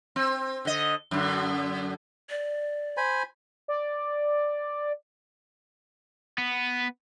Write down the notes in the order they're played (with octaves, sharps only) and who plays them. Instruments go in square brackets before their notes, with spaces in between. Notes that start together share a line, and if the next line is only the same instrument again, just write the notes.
[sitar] C4
D3 D#5
F#2 D3
[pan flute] D5
[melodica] C5 G#5 B5
[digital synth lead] D5
[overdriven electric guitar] B3